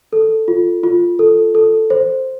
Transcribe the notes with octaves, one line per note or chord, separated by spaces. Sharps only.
A4
F4
F4
A4
A4
C5